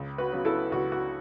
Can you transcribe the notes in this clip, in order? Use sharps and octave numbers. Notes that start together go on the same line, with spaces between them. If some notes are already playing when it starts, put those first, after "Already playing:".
Already playing: C#2
F#4 B4
C#3 F#3 B3
E4 A4
C#2 F#4
F#4